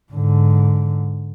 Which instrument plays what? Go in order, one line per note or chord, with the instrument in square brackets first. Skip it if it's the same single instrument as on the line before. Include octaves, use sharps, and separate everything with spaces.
[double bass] G#2 D3